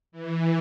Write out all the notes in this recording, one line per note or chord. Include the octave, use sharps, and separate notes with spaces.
E3